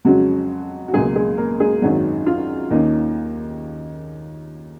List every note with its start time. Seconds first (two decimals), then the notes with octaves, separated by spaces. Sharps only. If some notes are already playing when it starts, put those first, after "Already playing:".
0.05 F2 C#3 F#3 G#3 C#4 F#4
0.88 F#4
0.93 C#2 B2 F#3 G#3 A#3 G#4
1.16 G#3 G#4
1.38 A#3 A#4
1.60 G#3 G#4
1.82 G#1 F#2 D#3 F#3 G#3 C#4 F#4
2.26 F4
2.71 D#2 D#3 A#3 C#4 D#4